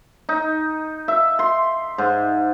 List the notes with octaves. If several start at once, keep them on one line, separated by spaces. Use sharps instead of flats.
D#4
E5
C6
G#2